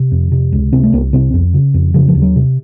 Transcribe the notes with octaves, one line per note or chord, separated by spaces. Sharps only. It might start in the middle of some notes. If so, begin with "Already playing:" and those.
Already playing: C3
F2
C3
C#2
C3 C4
A3
C2 A#3
C3 C4
F2
C#3
F2
C#3 F3
F3
D#2
F#3
C3